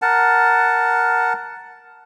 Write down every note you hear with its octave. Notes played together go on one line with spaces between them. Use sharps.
A#4 F#5 A5